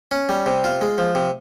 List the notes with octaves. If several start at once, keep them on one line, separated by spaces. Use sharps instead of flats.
C#4
G3
C3
F4
G#3
F3
C3